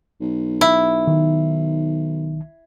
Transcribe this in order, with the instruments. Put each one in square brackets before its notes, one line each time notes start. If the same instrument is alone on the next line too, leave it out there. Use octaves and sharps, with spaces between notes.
[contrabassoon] B1
[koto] E4
[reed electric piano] D#3